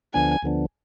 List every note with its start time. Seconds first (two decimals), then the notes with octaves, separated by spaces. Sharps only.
0.14 D2 D3 F3 B3 D4 G#5
0.42 D2 D3 F3 B3 D4